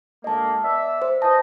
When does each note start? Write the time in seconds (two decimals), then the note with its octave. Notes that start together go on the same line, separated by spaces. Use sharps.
0.24 D2 G#3 A#3 D#5 A5
0.63 B3 D5 E5
1.02 C5
1.22 E3 C5 D#5 A5